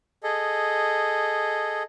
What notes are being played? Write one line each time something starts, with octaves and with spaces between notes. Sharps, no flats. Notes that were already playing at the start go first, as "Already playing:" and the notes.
G#4 A4 D#5